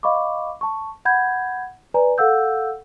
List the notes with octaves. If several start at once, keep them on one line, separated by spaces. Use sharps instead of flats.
D#5 F5 B5 C#6 D6
A5 C#6
F#5 B5 G6 G#6
B4 D5 G#5 A#5
A4 F5 F#5 E6 G6